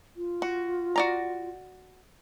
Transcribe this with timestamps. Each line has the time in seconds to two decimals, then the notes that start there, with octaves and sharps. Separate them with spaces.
0.16 F4
0.42 F#4
0.96 F#4 D5 A#5